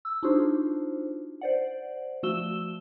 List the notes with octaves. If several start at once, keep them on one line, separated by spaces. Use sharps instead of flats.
E6
D4 D#4 F4 F#4 G#4 C5
C5 D5 F#5
F3 A3 F#4 E6 E7 G7